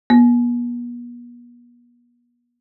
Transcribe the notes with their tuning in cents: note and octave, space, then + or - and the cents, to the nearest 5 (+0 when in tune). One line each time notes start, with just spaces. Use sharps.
B3 -40